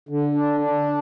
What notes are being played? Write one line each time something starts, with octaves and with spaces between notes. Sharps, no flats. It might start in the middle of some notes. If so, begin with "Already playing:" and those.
D3
D4
D4